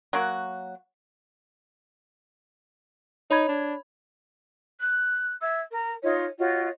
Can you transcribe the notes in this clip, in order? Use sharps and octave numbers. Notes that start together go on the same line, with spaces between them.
F#3 A#3 F#4
D#4 C#5 B5 G#6
D4
F#6
E5 E6 G#6
A#4
D#4 F4 C#5 D#5
F4 F#4 C#5 D#5